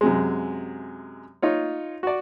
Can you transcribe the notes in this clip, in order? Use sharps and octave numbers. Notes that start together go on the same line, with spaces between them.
F#2 C3 G#3
D#4 F4 C#5
F#4 D5